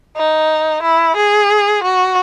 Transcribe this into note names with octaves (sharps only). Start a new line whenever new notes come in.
D#4
E4
G#4
F#4